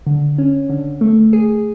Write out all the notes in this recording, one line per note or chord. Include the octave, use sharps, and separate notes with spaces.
D3
C#4
D3
A3
G#4